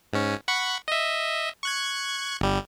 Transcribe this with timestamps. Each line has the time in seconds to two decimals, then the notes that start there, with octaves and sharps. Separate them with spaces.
0.13 G#2 C#4
0.48 F#5 B5 C#6
0.88 D#5 E5
1.63 C#6 F#6 G#6
2.41 G1 G3